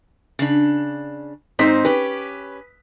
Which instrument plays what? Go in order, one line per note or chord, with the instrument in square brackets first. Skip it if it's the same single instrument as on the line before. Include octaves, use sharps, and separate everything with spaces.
[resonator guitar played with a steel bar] C#3 D4
[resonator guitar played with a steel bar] G#2 C5 [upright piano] C4 D#4 B6
[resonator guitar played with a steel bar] C#4 G4 [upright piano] B4